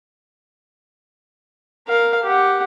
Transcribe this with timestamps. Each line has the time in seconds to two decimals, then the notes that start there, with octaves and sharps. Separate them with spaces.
1.88 A#4 F5
2.23 G4 F#5